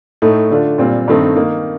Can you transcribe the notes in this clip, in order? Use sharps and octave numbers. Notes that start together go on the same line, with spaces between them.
A2 A3 D#4
D3 A3 D4 F4
A#2 G3 C4 F4
G2 D#3 A3 C4 D#4
D#3 A#3 D#4